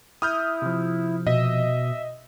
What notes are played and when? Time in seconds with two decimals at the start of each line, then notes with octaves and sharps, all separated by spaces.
0.22 E4 D#6 F6 G6
0.62 C3 F3
1.27 B2 D#5 E5